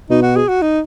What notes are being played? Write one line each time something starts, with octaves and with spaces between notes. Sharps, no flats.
B2 D#4
F#4
G#4
F#4
D#4